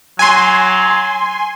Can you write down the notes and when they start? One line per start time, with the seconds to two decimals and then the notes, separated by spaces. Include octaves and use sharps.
0.19 F#3 G#5 C6